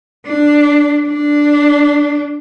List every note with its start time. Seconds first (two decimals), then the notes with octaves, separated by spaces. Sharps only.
0.26 D4
1.08 D4